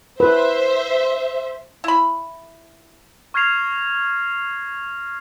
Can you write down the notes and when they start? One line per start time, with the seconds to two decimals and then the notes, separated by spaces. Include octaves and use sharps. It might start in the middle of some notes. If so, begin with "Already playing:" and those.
0.20 B4 C5 E5
1.84 E4 B5
3.34 C#6 F6 G#6 A#6 C7 F7